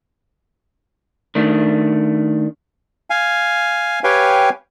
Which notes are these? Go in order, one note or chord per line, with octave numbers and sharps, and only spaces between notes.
D#3 A3 D4
F5 G#5
G4 B4 C#5 F5 G5 G#5